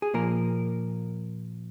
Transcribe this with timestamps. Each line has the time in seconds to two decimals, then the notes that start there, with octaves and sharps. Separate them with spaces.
0.02 G#4
0.14 A#2 F3 A#3 A#4